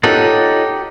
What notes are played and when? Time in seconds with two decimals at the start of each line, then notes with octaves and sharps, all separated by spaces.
0.03 D#4 F4 G4 A4 C#5 F#5